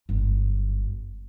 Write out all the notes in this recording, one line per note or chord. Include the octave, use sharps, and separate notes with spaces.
G1 F#2